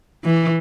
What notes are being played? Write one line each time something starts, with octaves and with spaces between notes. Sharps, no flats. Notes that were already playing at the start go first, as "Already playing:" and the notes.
E3